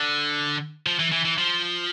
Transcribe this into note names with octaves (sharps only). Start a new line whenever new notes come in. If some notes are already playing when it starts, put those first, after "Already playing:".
Already playing: D3
F3
E3
E3
E3
F3